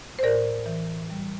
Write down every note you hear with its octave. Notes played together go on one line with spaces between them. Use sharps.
C5
A2 A#4 D5
E3
G3